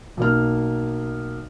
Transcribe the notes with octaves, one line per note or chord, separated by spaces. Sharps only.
B1 A#3 F6